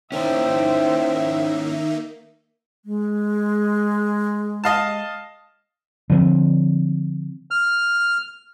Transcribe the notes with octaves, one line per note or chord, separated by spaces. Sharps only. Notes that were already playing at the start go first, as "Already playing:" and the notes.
D#3 A#3 C#4 D#4 E4 C5 E5 G5
G#3
D#5 F5 A5
D3 F3 A3 C4
F6